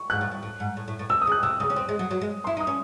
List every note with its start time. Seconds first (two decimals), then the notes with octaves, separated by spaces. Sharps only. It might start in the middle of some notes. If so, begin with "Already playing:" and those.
Already playing: C#6
0.10 G#2 F#6
0.21 A2
0.31 A2
0.43 A2
0.60 G#2
0.77 A2
0.88 A2
0.99 A2
1.09 C3 E6
1.22 D#6
1.27 C#3
1.32 F#6
1.43 C3 E6
1.60 C#3 D#6
1.70 C#4
1.76 C4
1.89 G#3
1.99 F#3
2.11 F#3
2.21 G#3
2.44 E4 C6
2.57 D#4 D#6
2.67 C#4